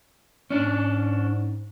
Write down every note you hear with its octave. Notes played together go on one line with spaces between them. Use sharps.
G#2 C#4 D4